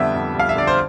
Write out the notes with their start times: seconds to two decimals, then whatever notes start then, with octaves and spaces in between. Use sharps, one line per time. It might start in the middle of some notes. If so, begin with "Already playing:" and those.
Already playing: F2 D3 G3 B3 E5
0.15 F2
0.35 G3 F5
0.49 E5
0.56 D3 D5
0.67 C5